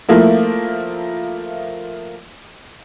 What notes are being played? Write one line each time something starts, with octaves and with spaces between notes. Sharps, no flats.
F3 A3 A#3 E4